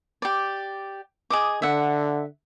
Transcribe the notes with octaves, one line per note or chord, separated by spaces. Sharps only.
G4 D5
G#4 D#5 D6
D3 E5 F#5